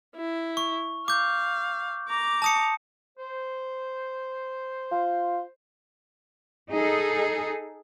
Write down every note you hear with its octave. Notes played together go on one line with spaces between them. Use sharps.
E4
C#6
F5 D6 G6
A#5 D6
A5 D#6 C#7
C5
F4
D#4 G#4 A4